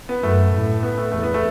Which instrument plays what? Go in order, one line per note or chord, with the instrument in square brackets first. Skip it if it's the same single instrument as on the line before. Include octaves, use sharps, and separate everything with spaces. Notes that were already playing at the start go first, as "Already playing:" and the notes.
[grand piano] B3
[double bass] F#2 [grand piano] A3
[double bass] A2
[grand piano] B3
A3
[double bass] E2 [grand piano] A3
[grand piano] B3
A3